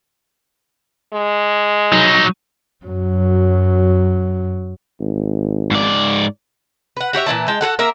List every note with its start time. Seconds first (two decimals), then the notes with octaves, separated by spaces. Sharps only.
1.13 G#3
1.93 F#3 D#4
2.86 F#2 F#3
5.00 G#1
5.71 G#2 D5
6.97 B4 F#5
7.13 F#4 G4 C#5 E5
7.26 A#2 E3 E4 A5
7.48 G#3 G5 A5
7.61 F#4 G#4 A4 F#5
7.79 A#3 A#4 E5